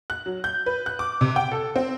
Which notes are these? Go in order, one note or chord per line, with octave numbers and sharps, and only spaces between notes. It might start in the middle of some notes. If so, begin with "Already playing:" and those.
F#6
F#3
G6
B4
F#6
D6
C3
G5
A4
C4